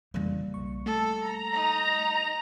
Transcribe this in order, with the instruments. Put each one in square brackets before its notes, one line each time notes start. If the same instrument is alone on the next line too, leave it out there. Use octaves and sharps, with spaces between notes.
[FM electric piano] F2 C#3 E3 [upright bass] G3 A#3
[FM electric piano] B1 C#6
[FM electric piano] A3 [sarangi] A4
[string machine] A#5
[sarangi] D#4